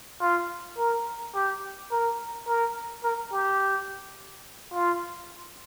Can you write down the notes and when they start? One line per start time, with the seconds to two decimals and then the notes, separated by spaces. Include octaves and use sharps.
0.21 F4
0.78 A#4
1.34 G4
1.91 A#4
2.47 A#4
3.04 A#4
3.32 G4
4.74 F4